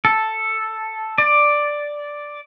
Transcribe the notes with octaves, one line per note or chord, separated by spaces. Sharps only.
A4
D5